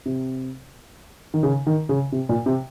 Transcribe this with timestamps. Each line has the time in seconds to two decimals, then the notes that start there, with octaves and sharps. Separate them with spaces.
0.06 C3
1.34 D#3
1.43 C#3
1.67 D#3
1.89 C#3
2.12 C3
2.29 A#2
2.46 C3